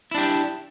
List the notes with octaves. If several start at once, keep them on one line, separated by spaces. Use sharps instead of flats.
D4 E4 G4